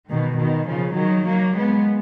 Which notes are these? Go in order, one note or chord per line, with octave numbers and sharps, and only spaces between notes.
B2 D#3
B2 D#3
C#3 F3
D#3 F#3
F#3 A#3
G#3 B3